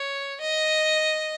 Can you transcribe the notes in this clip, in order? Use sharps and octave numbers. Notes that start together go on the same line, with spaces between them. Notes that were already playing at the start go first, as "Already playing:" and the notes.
Already playing: C#5
D#5